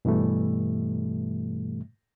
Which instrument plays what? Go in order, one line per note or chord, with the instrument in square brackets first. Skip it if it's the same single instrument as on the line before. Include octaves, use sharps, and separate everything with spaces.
[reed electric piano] G2 B2 E3 G3 A3